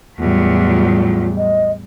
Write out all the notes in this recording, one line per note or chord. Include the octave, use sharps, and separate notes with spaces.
E2 A2 F#3 G3 F4
F4
D#5